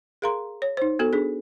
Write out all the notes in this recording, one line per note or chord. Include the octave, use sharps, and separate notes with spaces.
G#4 A#4 F5 A#5 C6
C#5
D#4 C5
B3 F#4 A4
D4 G#4